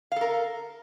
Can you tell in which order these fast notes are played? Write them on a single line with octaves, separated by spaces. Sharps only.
F5 A4 A#4